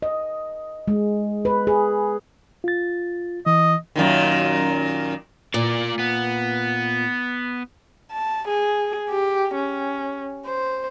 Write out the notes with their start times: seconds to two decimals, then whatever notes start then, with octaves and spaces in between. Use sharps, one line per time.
0.02 D#5
0.88 G#3
1.45 B4
1.67 G#4
2.64 F4 A6
3.46 E3 D#5
3.96 F#2 A#2 D#3
5.54 A#2 A#3 D5
5.99 B3
8.11 A5
8.48 G#4
9.10 G4
9.54 C#4
10.46 C5